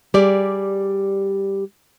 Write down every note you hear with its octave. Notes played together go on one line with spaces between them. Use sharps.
G3 G4 G#4 D5